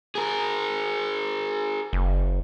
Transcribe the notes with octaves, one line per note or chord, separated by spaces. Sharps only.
G#4 A#4
F#1